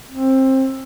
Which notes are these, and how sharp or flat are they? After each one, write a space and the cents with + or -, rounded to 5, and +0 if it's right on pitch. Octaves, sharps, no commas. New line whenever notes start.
C4 +20